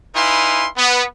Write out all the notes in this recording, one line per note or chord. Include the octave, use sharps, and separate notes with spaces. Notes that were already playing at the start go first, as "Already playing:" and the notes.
D#4 E4 B4 F5 G#5 C6
B3